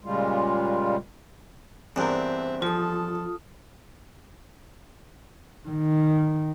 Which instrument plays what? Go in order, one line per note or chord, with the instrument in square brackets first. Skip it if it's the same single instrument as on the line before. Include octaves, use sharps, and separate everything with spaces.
[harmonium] A#2 C#3 G3 G#3 F4
[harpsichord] E2 G2 [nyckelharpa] C4 E5 [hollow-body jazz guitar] D4 A#4 [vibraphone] C5
[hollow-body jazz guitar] F3 [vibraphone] F4 D#6 [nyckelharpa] A4 A5
[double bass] D#3